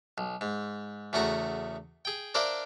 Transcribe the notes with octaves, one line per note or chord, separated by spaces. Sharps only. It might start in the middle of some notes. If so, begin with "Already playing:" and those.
B1
G#2
E2 C#3 A3 F#4 A#5
G#4 G5
D4 A#4 C5 D5 E5 F5